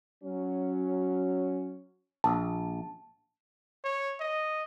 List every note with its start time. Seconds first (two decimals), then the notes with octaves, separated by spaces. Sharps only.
0.22 F#3 C#4
2.24 A#1 A5
3.84 C#5
4.20 D#5